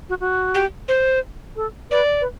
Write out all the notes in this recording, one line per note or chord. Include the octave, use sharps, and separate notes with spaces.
F#4
F#4
G4
C5
A4
B4 D5
B4